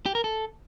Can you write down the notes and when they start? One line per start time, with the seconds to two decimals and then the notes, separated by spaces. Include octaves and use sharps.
0.06 G4
0.15 A#4
0.24 A4